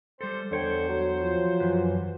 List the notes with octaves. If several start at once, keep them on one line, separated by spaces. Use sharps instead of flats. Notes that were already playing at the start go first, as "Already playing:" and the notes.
G3 A4 C5
E2 D3 C5 C#5 G5
F#3
F3
F#2 E3 B4